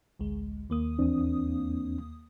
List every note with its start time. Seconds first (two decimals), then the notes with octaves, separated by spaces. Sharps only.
0.19 A1 D2 G#3
0.70 D#2 A#3 D#6
0.99 E2 C4 D4